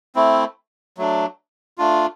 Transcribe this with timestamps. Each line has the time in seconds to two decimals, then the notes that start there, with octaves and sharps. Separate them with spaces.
0.15 A3 C4 E4
0.98 F#3 A3 D4
1.78 A3 D4 F4